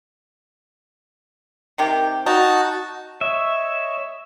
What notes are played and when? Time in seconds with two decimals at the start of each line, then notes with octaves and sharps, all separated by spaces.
1.78 C3 D#3 G4
2.26 D#4 F#4 A5
3.21 C#5 D#5 E5 C#6